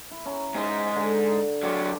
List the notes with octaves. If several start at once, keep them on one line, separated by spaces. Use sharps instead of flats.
E4
C#4 A#5
G#2 D#4
D3
F#3 D4 D5